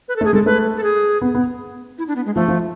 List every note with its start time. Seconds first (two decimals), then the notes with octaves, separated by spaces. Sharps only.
0.08 B4
0.16 A4
0.21 A3
0.25 G#4
0.33 G#3 A4
0.46 A3 B4
0.77 A4
0.84 G#4
1.21 B3
1.35 B3
1.98 E4
2.08 D4
2.16 B3
2.26 G#3
2.35 F3 A3
2.48 F3